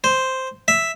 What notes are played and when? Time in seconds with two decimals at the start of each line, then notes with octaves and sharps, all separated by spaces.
0.04 C5
0.68 E5